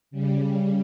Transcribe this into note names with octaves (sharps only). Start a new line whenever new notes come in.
C#3 G3